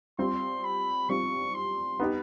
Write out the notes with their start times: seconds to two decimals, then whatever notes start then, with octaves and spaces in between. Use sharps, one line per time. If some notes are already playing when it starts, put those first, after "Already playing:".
0.19 G3 C4 F4 C6
0.64 B5
1.09 G3 C4 F4 C#6
1.55 C6
2.00 B3 D#4 G4